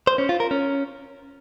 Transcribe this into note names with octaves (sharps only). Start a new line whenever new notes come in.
C5
C#4
F4
A#4
C#4